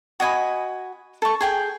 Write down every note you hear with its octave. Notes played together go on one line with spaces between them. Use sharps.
F#4 D#5 G#5 B5
A4 C#6
G#4 G5 G#5